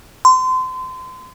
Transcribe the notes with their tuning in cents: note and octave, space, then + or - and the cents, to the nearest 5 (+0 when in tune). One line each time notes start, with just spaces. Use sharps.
C6 -30